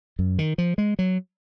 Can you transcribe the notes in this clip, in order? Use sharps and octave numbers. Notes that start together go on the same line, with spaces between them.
F#2
D#3
F3
G#3
F#3